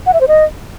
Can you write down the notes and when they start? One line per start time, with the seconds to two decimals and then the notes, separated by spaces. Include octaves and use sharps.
0.06 F#5
0.13 E5
0.21 C5
0.28 D#5